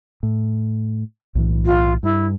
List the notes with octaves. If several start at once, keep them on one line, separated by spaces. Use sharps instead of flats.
A2
B1 A2 E3
F4
G2 E4